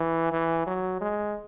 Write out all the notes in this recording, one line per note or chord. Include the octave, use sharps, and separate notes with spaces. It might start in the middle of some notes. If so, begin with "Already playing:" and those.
Already playing: E3
E3
F#3
G#3